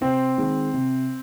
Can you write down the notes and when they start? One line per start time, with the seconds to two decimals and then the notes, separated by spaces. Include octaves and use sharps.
0.01 C3 C4
0.38 D#3 G#3
0.74 C3